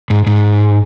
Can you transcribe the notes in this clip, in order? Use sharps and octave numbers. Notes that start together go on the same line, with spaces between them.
G#2
G#2